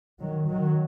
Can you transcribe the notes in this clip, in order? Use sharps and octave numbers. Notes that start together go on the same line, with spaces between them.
D#3 F#3
D#3 F#3